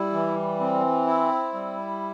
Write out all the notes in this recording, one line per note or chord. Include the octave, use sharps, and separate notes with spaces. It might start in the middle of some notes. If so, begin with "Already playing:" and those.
Already playing: G3 E4
E3
C4
E4
G3